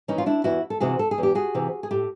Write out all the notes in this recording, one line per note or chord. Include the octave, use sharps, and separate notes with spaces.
E3 C#4 D#4
F4
D4 E4
E2 E4 F#4
A4
C3 E3 F#4 G#4
A4
G#4
E2
G4
F#4 G#4
C3 E3
G#4
A2 G4 A4